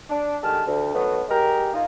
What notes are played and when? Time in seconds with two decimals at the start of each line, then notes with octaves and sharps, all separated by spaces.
0.09 D4
0.43 D#3 G#3 A3 G4 A5 F6
0.67 D2
0.94 D#3 F#3 A3 B3
1.29 G#3 G4 A#4
1.74 A#3 D#4 F4